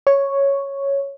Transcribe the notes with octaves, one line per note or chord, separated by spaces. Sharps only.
C#5